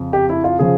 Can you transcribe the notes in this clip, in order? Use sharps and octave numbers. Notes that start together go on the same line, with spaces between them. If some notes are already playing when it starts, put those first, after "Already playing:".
Already playing: F2 C#3
G4
E4
F4
C#3 F3 G#4